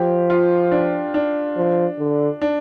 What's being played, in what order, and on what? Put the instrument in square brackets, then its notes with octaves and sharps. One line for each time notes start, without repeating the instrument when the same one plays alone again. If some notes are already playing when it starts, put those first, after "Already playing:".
Already playing: [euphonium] F3 [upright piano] G4
[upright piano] F4
D4
D4
[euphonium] F3
D3
[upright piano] D4